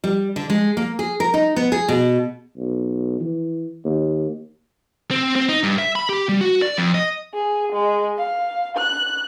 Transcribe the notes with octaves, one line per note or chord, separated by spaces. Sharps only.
G3
D3
G#3
A#3
G#4
A#4
D#4
B3
G#4
B2
B1
E3
D#2
C4
C4
D#4
G2
E5
B5
G4
G3
F#4
D5
F2
D#5
G#4
G#3
F5
F#6